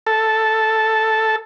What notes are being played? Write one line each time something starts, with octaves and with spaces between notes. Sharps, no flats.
A4